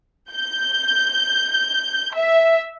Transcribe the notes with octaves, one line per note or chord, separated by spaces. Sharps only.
G6
E5